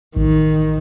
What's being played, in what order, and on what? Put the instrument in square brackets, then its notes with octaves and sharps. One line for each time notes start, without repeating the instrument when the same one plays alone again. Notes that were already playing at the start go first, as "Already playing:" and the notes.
[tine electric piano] A1 [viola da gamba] D#3